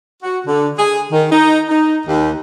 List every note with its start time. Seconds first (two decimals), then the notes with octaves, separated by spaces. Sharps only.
0.23 F#4
0.46 D3
0.77 G#4
1.12 D#3
1.30 D#4
1.69 D#4
2.06 D#2